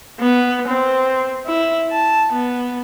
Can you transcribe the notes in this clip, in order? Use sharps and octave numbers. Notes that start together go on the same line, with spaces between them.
B3
C4
E4
A5
B3